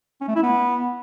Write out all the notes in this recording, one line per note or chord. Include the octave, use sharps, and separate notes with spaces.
C#4
A3
E4
B3